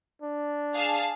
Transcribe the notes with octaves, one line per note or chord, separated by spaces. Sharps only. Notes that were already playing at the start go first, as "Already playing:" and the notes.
D4
G#4 F5 A5